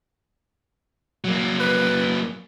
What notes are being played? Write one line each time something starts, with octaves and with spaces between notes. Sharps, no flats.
F#3 A#3
B4